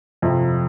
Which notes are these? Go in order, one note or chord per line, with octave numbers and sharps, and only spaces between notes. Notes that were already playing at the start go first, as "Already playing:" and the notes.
F2 C3 F3